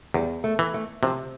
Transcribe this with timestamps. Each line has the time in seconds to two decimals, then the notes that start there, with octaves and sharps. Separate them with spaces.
0.14 E2 G3
0.44 A3
0.59 E3
0.74 A3
1.03 C3 F3